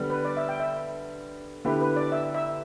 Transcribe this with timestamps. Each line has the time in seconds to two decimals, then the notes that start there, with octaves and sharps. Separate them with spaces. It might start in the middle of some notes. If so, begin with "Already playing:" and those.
Already playing: D3 G3 B3
0.10 B4
0.25 D5
0.37 E5
0.49 G5
0.60 E5
1.65 D3 B3 E4 G4 B4
1.81 B4
1.96 D5
2.12 E5
2.35 E5